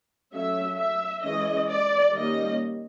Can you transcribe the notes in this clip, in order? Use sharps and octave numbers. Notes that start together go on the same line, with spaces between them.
F#3 A3 C#4 E5
E5
E3 G#3 C#4 D#5
D5
D#3 G3 A#3 C#4 D#5